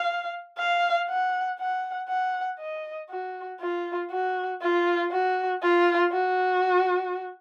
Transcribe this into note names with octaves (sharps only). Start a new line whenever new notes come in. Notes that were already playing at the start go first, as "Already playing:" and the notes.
Already playing: F5
F5
F#5
F#5
F#5
D#5
F#4
F4
F#4
F4
F#4
F4
F#4